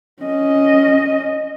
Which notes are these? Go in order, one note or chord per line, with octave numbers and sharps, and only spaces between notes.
C#4 D#5